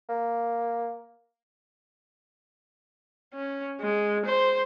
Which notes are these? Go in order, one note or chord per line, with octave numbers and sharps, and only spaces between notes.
A#3
C#4
G#3
C5